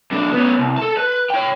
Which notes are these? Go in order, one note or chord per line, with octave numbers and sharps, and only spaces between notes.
B1 D4
B3 C#4
C2
A4 A5
B4
C#5 G5